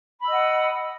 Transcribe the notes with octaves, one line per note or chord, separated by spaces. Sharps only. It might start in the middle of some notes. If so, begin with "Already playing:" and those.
D#5 F#5 B5 E6